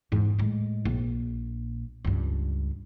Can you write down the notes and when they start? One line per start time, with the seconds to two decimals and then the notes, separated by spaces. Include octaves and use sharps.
0.12 E2 G#2
0.39 A2 G#3
0.85 A#1
2.05 C#2 G2